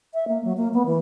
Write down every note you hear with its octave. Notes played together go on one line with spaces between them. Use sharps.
E5
A#3
F#3
A#3
B3
E3